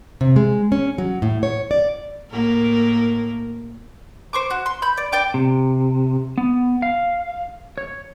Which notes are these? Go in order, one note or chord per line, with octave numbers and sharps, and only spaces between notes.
C3
G#3
C#4
F#3
A2
C#5
D5
A2 A#3 A#4
C5 C#6 D6
F#4
C6
B5 G6
D5
D5 G5 D6
C3
B3
F5
C#5